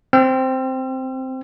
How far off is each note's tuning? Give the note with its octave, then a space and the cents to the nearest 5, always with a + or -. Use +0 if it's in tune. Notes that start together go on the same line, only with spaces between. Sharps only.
C4 +0 E6 +45